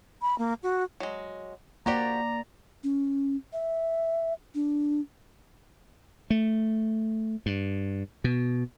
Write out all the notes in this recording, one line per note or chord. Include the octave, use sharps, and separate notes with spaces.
B5
A#3
F#4
F#3 G#3
F3 A#3 F#4 G4 D5 A#5
C#4
E5
D4
A3
G2
B2